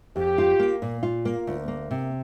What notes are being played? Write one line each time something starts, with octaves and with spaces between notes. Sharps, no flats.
F2 G4
F4
A#3
A#2
F4
A#3
D2
A#3
C3